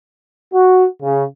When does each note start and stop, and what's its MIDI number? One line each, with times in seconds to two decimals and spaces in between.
0.54 0.86 66
1.02 1.25 49